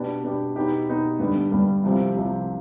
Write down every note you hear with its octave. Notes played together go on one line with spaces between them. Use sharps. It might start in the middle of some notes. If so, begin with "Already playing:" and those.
Already playing: B2 B3 D4 G4
B2 B3 D4 G4
B2 B3 D#4 G4
B2 B3 D#4 G4
G2 D3 G3 B3
G2 D3 G3 B3
C2 C3 F3 C4 G4
C2 C3 F3 C4 G4